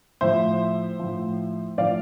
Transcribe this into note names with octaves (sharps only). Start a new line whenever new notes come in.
A2 F3 C5 E5
A2 F3
A2 F3 D5 F5